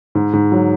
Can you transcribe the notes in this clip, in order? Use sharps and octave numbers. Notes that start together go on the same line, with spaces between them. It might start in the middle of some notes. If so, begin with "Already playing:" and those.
G#2
G#2
F#3